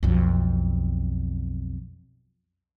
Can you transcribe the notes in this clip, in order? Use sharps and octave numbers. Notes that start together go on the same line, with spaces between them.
B1 F2